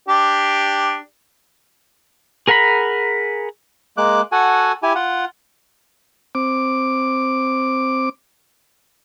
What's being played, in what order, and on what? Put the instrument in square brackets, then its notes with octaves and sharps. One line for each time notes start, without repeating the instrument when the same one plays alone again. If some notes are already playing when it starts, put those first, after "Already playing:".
[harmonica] D4 G4
[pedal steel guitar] G#4 A#4 F#5 A#5 B5
[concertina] G#3 A#3 D6 F#6
F#4 A4 F#5 G#5
E4 G4 G#5
F4 F#5
[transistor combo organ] C4 D6